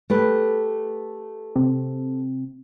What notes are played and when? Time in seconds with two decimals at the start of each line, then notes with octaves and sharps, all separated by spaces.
0.10 A3 G4 B4
1.56 C3